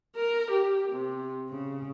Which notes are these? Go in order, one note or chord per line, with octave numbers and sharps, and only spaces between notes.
A#4
G4
C3
C#3